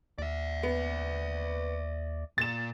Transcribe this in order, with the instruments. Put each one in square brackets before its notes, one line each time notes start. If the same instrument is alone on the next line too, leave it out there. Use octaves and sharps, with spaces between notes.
[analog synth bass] D#2 [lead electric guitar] D5 E5
[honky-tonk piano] B3
[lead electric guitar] A#2 [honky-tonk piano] A6 E7